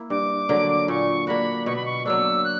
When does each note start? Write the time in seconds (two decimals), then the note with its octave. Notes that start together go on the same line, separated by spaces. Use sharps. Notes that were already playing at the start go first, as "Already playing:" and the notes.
Already playing: A#3 E4
0.10 G2 D6
0.49 D3 F#3 A#3
0.88 A#2 C#6
1.27 A#3 D4 F#4 B5
1.66 B2 C#6
1.76 B5
1.86 C#6
2.06 F#3 A#3 D4 E6
2.44 F#6